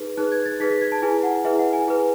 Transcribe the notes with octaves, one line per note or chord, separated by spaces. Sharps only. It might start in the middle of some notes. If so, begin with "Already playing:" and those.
Already playing: D#4 G#4 B4
D#4 G#4 B4 F#6
G#6
A6
D#4 G#4 B4 B6
B6
G#6
A5
E4 G#4 B4 G#5
F#5
E4 G#4 B4 E5
F#5
G#5
E4 G#4 B4